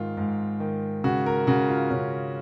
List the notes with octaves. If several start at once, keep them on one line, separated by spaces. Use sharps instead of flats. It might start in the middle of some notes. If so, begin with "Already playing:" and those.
Already playing: G#2 D#3 F4
G#2
D#3
C#3 F#4
A#4
C#3 F#4
F4
C#3 C#4